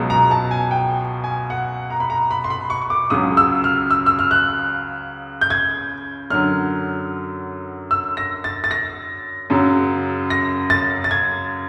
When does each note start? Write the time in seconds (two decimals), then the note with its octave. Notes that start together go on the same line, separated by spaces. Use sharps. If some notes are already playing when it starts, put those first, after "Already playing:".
Already playing: C#2 B2 F#3
0.10 A#5
0.31 A5
0.51 G#5
0.71 G5
1.24 G#5
1.50 F#5
1.90 A#5
2.00 B5
2.10 A#5
2.31 B5
2.44 C6
2.50 B5
2.70 C#6
2.82 C#6
2.90 D6
3.10 C#2 C#3 F#3 D#6
3.37 E6
3.64 F6
3.90 E6
4.06 E6
4.19 F6
4.31 F#6
5.41 G6
5.50 G#6
6.30 F#2 D3 F#3 F6
7.91 E6
8.17 A#6
8.44 A6
8.64 A6
8.71 A#6
9.50 F#2 C#3 F#3
10.30 A#6
10.70 A6
11.04 A6
11.11 G#6